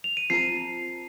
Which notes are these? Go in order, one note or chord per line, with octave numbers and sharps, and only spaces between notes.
F7
D#7
F3 C4 F4 A#4 C7